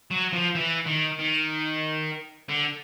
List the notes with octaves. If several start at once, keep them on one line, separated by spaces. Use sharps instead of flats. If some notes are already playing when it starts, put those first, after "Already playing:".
F#3
F3
E3
D#3
D#3
D3